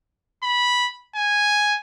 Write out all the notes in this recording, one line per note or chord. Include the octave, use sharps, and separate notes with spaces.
B5
G#5